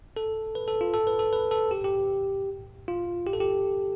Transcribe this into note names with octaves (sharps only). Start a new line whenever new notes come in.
A4
B4
A4
F4
A4
B4
A4
B4
A4
G4
G4
F4
G4
A4
G4